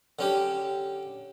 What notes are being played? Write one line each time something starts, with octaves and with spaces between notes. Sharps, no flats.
D3 C#4 G4